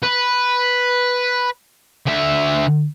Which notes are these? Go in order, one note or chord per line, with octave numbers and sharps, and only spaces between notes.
B4
D3 E5